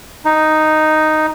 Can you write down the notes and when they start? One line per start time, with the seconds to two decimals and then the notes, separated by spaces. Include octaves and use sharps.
0.25 D#4